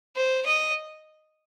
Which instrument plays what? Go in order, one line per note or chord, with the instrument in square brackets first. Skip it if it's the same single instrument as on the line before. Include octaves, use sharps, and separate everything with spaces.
[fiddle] C5
D#5